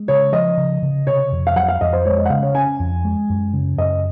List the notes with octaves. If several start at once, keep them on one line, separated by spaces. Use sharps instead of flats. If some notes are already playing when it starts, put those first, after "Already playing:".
Already playing: G#3
C#3 C#5
F3 D#5
C#3
C#3
C3 C#5
F2
F5
F#3 F#5
F5
F2 D#5
C5
G#3 C#5
D#5
F#5
C#3 F5
C#5
C#4 G#5
F2
G#3
F#2
C#3
F#2 D#5